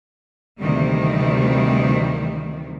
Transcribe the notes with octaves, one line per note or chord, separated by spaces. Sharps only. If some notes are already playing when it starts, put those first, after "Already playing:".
D2 C3 D#3 E3 G3 A#3